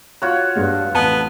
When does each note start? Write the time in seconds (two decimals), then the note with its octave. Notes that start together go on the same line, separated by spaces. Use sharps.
0.22 F4 F#4 C#5 F#6
0.56 G2 G#3 D4
0.95 A1 F2 B3 A5